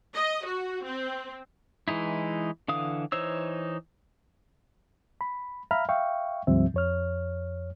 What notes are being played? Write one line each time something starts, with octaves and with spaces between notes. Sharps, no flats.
D#5
F#4
C4
E3 G#3 D#4 E4
D3 E3 F5 D#6
E3 D#4 C5 C#5 E6
B5
E5 F5 A#5 B5 F6
E5 F5 G5 C#6
D2 G#2 F3 G3 C4 E5
F2 C#5 F6